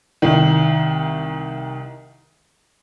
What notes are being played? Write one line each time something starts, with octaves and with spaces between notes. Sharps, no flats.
C2 D#3